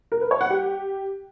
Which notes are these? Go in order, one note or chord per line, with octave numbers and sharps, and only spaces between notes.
A#4
B4
C#5
F#5
G4